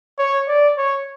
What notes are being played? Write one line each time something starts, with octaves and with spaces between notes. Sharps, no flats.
C#5
D5
C#5